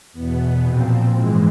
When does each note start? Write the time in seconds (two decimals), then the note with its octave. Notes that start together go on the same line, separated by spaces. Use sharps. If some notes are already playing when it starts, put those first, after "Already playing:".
0.13 E2 B2 B3
0.62 A#2 F3 C4
1.13 G#2 E3 G#3